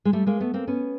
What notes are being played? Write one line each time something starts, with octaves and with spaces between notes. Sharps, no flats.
G#3
G3 A3
G#3 A#3
A3 B3
A#3 C4
B3 C#4